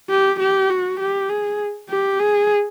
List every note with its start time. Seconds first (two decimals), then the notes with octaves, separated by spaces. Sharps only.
0.10 G4
0.40 G4
0.70 F#4
1.00 G4
1.29 G#4
1.90 G4
2.20 G#4